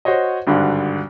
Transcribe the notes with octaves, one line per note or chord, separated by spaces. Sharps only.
F#4 C5 C#5 D#5
G#1 G2 D3 D4 F#4